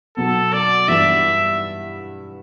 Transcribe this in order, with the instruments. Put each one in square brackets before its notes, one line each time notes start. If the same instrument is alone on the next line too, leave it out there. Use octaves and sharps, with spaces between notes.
[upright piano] B2 F#3 B3 [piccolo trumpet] A4
[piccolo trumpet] D5
[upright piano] G2 E3 G3 B3 [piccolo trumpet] E5